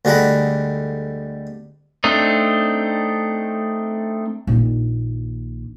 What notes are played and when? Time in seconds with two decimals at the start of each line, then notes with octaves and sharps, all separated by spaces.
0.05 D2 G3 G#3 F#5 A#5 B5
2.04 A3 C4 D4 D#4
4.47 A#1 D#3